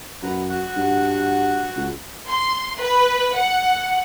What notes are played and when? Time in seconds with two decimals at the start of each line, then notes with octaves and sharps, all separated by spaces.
0.23 F#2 B4 F#5 A#5
0.49 F#4 F#5
0.76 G2
1.76 C#2
2.28 C6
2.77 B4
3.37 F#5